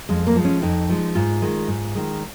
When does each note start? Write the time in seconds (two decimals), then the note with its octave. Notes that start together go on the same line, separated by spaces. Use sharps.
0.09 F2 G#3
0.27 A#3
0.36 F3 G#3
0.45 C#4
0.62 F2 D#4
0.89 F3 G#3
1.15 G#2 F4
1.42 D#3 G#3
1.68 G#2
1.95 D#3 G#3